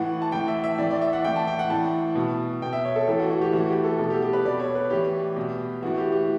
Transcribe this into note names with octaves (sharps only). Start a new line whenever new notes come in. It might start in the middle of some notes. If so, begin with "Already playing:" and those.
Already playing: A2 E3 F#5
A5
A2 E3 G5
E5
E5
A2 E3 D5
D5
E5
F#5
A2 E3 G5
A5
G5
F#5
A2 E3 A5
B2
B2 G5
E5
C#5
A4
A2 E3 A4
F#4
F#4
G4
A2 E3 F#4
G4
A4
B2 A4
G4
G4
B4
B2 D5
C#5
B4
A2 E3 G4
B2
A2 E3 F#4
G4
G4